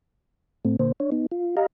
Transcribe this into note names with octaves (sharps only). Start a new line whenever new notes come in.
A2 A3 C4
A#2 D3 A#3 C5
D4 C#5
B3 D#4
F4
G4 D#5 F5 A#5